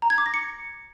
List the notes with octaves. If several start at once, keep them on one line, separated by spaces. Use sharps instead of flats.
A#5
G#6
D6
A#6
C#7